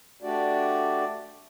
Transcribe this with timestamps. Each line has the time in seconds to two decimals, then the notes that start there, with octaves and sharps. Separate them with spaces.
0.22 A3 D4 F#4 G4 D5